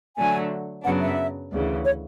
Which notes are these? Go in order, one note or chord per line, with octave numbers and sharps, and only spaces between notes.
D3 F#3 A3 G#5
F#2 C#3 F#3 B3 D4 F#5
E5
D2 C#3 E3
C#5